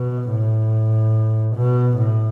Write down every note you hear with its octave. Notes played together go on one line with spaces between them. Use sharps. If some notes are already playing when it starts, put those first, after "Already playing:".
Already playing: B2
A2
B2
A2